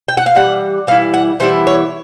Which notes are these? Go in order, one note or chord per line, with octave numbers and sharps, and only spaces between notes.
G5
F#5
F5
E3 G3 F#5
E3 G3 E4 F5
F#5
E3 G3 B3 E4 C5
C#5